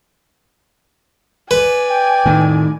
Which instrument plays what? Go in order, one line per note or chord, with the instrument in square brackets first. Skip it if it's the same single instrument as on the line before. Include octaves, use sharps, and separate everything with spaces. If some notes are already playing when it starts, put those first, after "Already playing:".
[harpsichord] B4 [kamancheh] D5 G#5
[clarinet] G5
[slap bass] A2 D#3